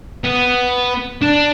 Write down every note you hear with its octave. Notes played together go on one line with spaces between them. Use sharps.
B3
D4